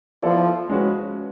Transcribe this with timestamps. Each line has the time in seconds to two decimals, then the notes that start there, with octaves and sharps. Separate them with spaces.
0.23 F3 B3 E4 A4 D5
0.69 G#3 C#4 F#4 B4